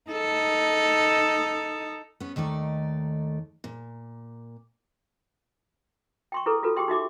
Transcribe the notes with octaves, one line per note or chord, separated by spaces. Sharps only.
D#4 A4
B3 C#4
D#2 D#3 A3 D5
A#2
G5 C6 C#6
E4 G#4 A4 B4
F4 F#4 A4 B4
G4 G#4 G5 C6
D#4 F#4 E5 D6